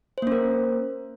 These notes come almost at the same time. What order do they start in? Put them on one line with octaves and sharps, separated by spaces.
C5 A#3 C#4 A#4